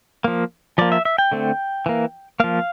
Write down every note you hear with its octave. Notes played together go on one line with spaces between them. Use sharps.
F3 A#3
F3 A#3 D5
E5
E5
G5
D3 A3 C4
E3 A#3
F3 A#3 F5